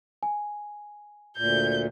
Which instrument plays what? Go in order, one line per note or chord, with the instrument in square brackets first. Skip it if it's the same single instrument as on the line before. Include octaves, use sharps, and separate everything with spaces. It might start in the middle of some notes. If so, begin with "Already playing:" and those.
[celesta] G#5
[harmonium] D2 A#2 [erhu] G6